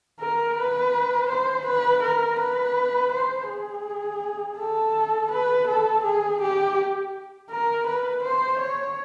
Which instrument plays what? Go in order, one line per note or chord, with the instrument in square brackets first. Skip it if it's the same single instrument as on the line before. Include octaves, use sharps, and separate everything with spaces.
[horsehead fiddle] A#4
B4
C5
B4
A#4
B4
C5
G#4
A4
B4
A4
G#4
G4
A#4
B4
C5
C#5